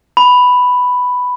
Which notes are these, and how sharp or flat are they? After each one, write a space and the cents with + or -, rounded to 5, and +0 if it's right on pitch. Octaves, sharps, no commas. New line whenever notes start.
B5 +5